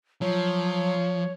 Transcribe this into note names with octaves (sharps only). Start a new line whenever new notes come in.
F3 F#3 C#5